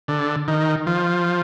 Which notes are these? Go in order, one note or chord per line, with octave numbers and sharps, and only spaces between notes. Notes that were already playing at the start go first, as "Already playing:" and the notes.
D3
D#3
F3